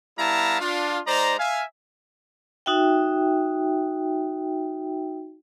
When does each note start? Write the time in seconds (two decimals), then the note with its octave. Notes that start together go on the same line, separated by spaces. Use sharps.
0.19 G3 B3 E4 F5 A5 A#5
0.61 D4 F4
1.07 G#3 D#4 C5 D5 A#5
1.39 E5 F5 G#5
2.66 D#4 F#4 E5 G5